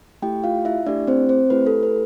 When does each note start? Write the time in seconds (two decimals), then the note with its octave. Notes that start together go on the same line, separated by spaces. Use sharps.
0.22 A3 E4 G4 G5
0.44 F4 F5
0.65 E4 E5
0.86 A3 D4 E4 G4 D5
1.07 C4 C5
1.29 C4 C5
1.50 A3 E4 G4 B4
1.67 A4
1.83 B4